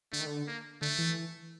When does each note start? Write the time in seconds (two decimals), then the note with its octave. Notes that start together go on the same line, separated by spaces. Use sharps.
0.13 D3 A3
0.20 D#3
0.26 D3
0.47 A#3
0.82 D3 A3
0.99 E3